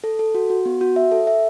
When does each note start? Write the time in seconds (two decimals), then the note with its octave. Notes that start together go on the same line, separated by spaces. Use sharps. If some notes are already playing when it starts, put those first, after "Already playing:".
0.04 A4
0.19 A4
0.35 F#4
0.50 F#4
0.65 B3
0.81 F#4
0.96 E5
1.12 A4
1.27 E5